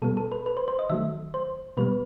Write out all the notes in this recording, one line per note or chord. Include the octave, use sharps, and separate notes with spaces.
B2 G3 B3 A4
A4
B4
B4
C5
C5
D#5
D#3 F#3 A3 E5
C5
B2 G3 B3 B4